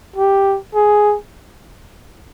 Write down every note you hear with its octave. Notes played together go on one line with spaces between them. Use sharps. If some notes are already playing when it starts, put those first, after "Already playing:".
G4
G#4